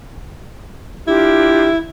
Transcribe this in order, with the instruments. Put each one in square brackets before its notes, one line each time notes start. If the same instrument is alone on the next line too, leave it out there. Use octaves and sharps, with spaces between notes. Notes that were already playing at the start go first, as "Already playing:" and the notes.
[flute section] D4 F4 G4 [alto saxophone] E4